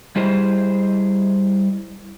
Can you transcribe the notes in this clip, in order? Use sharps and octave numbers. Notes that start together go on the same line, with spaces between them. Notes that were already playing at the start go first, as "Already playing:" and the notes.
G3 E4 G#4 C5 D#5